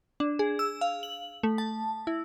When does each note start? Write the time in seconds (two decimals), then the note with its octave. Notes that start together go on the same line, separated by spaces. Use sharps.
0.20 D4
0.39 G#4
0.59 E6
0.81 F5
1.03 F#7
1.43 A3
1.58 A5
2.07 E4